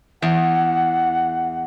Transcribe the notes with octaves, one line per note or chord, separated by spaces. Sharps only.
E2 F#5